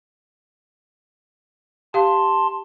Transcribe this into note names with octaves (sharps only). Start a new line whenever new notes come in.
G4 F5 A5 C6